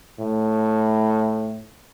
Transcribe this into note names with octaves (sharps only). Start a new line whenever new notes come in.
A2